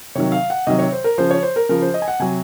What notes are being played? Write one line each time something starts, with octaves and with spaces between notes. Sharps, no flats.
C3 D#3 F#3 C#5
F5
F#5
C3 D#3 F#3 D#5
C#5
C5
A#4
C#3 F3 C5
C#5
C5
A#4
C#3 F3 A#4
C5
D#5
G#5
F#5
C3 F#3 G#5